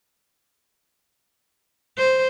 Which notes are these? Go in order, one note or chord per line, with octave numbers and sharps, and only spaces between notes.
C5